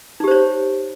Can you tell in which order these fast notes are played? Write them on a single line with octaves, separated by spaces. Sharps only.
D#4 G4 C5 C#5